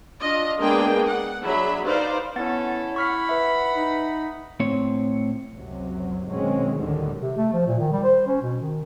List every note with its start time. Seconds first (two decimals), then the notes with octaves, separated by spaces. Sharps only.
0.21 D4 F4 D#5
0.60 G#3 A#3 B3 D4 G#4 G5
1.07 F#5
1.43 F#3 D4 G#4 E5 B5
1.85 D#4 B4 C5 D5 F5
2.36 B3 C#4 E4 A4 F#5 A6
2.96 F#5 B5 C#6 F6 B6
3.29 B4 E5
3.74 D#4
4.60 A2 C4 C#5
5.52 C#2 F#2 C3 F#3
6.29 B2 D#3 F#3 G#3 C4 C#4
6.78 D2 A2 D3 D#3 F#3 G3
7.21 C3
7.37 A3
7.53 F3
7.67 A#2
7.79 D#3
7.92 G3
8.04 C5
8.27 C#4
8.41 B2
8.61 D#3